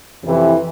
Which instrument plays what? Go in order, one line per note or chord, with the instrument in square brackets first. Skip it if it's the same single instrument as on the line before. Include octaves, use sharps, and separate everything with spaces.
[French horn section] F2 C3 E3